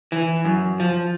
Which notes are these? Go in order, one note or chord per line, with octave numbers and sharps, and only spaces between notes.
E3
F#2
F3